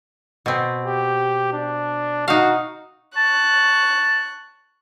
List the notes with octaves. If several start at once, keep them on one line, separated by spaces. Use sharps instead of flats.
B2 C4
G4
D4
D#4 F#4 F5
A5 C#6 F#6